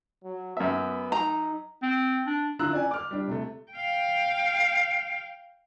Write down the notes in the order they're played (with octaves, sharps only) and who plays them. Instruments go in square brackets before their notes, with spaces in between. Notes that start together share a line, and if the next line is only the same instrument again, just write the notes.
[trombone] F#3
[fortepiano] F#2 E5 [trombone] B3
[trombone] D#4 [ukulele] A#5
[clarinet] C4
D4
[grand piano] D3 E4 F4 A#5 E6 F#6
C#4 D5 G#5
D6 F6
G3 D4
C3 A3
[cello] F5 G5